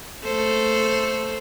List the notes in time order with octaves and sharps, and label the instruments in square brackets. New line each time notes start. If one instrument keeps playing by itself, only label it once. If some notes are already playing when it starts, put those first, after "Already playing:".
[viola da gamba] A3 A4 C5